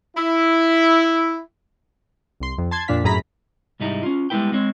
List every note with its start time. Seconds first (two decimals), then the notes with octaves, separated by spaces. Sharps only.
0.17 E4
2.40 C2 C6
2.58 F2
2.71 A5 C6 G#6 A6
2.88 F2 A#2 D4 F5 B6
3.04 F#2 A2 G#4 A#5 B5 B6
3.80 C2 G#2 G3 D#4 E4 A#5
4.03 C#4 F4
4.30 G3 G#3 B3 E4 B4 G5
4.52 G#3 C4 C#5